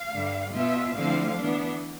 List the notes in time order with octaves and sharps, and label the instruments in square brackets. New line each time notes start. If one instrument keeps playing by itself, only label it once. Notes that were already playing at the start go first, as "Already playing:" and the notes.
Already playing: [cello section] F5
G2 D3 G3
B2 B3 F4 E5
D3 F3 A3 C4 E4 F5
E3 B3 D4